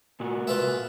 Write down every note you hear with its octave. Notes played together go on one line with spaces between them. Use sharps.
A#2 F#4
F4 B4 E5